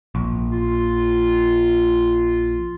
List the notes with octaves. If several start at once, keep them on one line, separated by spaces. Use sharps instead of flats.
A#1
F4